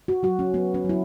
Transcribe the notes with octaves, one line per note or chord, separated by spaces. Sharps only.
F#4
F#3 F#4
C#4
F#3 B3
C#4
F#3 E4